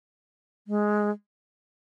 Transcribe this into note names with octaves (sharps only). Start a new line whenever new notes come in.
G#3